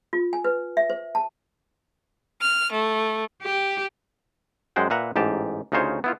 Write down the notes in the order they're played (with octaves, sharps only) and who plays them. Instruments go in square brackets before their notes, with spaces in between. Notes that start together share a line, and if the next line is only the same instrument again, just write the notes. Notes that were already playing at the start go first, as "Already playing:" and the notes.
[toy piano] F4
G#5
B4
E5
C5
A5
[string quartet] F6
A3
[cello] G4
[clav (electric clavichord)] F#2 G#3 C5 F#5 G5
A#2 B4 E5 F#5 A#5
A1 G#2 G4 A5
D2 C#3 D#4 F4 C5 C#5
B3 E4 F4